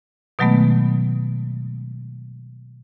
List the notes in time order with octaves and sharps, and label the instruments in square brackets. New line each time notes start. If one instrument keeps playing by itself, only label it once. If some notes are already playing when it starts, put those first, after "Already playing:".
[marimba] B2 D#3 F#3 G#3 A3 B3